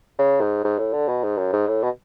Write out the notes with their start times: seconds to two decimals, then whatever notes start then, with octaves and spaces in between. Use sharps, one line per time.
0.19 C#3
0.41 G#2
0.64 G#2
0.79 A2
0.93 D3
1.08 B2
1.24 G#2
1.38 F#2
1.52 G#2
1.68 A2
1.83 B2